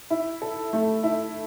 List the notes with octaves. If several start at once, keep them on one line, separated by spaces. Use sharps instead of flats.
E4
A4
A3
E4